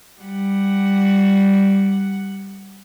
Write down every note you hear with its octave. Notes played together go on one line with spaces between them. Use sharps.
G3 F#5